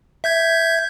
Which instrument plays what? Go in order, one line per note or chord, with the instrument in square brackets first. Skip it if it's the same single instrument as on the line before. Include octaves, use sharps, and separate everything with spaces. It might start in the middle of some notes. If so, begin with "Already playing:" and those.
[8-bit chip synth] E5 G6 G#6